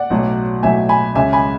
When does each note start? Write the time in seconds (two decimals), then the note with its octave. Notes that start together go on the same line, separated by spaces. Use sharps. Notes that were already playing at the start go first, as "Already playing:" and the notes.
Already playing: D5 F#5
0.10 B1 A2 F#3
0.63 B1 A2 F#3 E5 G#5
0.89 G#5 B5
1.15 C#2 C#3 G#3 C#4 E5 G#5
1.33 G#5 B5